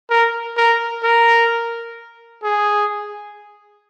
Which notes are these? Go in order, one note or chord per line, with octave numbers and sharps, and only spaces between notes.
A#4
A#4
A#4
G#4